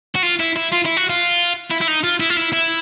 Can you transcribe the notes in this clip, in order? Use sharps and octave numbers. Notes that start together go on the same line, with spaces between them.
F#4
F4
E4
E4
F4
E4
F#4
F4
E4
E4
D#4
F4
E4
F4
E4
E4